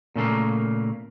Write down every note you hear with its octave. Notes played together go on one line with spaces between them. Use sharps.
A#2 C#3 A3 A#3